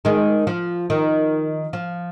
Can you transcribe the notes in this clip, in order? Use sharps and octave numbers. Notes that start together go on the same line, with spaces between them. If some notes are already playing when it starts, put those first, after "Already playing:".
D#3 G#3
F3
D#3
F3